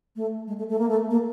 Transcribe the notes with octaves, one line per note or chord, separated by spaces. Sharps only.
A3
G#3
A3
A3
A#3
A3
A#3